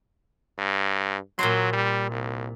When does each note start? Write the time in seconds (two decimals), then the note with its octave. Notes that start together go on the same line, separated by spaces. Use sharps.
0.58 G2
1.39 A#2 F#3 C5 C6
1.73 G3
2.11 C2